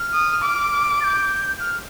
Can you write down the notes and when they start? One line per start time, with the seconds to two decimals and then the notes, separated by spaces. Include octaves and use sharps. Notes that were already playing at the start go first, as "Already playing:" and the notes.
Already playing: F6
0.13 D#6
0.42 D6
1.01 A6
1.04 G6
1.60 F6